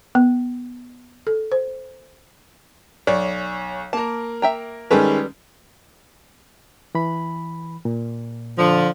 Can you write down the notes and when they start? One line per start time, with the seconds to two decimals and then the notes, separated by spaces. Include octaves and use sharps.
0.15 B3
1.27 A4
1.52 C5
3.07 B1 C#5 D5
3.93 A#3 A#4 A5
4.42 E5 G5 A#5
4.91 D#3 G3 G#3 C#4 A4 B4
6.95 E3 B5
7.85 A#2
8.57 D3 F3